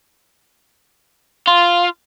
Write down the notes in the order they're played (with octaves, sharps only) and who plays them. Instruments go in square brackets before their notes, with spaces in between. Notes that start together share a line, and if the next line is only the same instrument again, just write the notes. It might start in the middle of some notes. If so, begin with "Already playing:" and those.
[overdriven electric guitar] F4